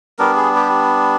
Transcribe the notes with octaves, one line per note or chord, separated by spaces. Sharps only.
G3 B3 D4 A#4
G#4
G4